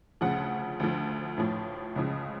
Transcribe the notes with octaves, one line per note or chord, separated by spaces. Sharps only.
D2 C#3 F3 F#5
D2 D3 F3
A1 A2 F3
C#2 C#3 F3